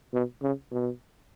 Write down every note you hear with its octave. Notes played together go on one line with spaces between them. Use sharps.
B2
C#3
B2